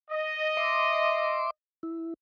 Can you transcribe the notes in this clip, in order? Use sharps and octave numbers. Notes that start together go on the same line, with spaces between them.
D#5
E5 C6 D6
E4